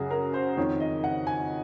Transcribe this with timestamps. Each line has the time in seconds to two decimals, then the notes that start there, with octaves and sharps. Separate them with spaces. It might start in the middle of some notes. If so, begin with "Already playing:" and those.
Already playing: F#2 C#3 F#4 G#4
0.11 A#4
0.34 C5
0.57 F2 D#3 C#5
0.80 D#5
1.04 F#5
1.27 G#5